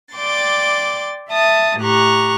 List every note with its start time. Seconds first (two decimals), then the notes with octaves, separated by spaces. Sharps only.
0.14 D5 G5 C6 D6 A6
1.29 E5 A5 D#6
1.79 A2 G4 A#5 C#6 F#6